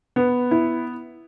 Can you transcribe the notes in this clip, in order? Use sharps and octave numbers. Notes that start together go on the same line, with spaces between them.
B3
E4